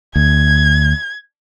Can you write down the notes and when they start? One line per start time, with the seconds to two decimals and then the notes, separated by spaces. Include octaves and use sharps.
0.16 D2 G#6